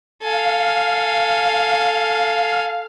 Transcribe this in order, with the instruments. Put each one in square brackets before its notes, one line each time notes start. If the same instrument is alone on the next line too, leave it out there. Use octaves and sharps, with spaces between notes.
[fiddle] A4 G#5 [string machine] F5